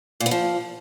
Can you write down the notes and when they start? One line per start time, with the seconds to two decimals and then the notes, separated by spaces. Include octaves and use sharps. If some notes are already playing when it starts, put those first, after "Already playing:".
0.20 A#2
0.26 B3
0.31 F3